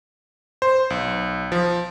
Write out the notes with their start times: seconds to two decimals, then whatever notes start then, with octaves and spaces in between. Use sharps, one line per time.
0.62 C5
0.90 B1
1.52 F3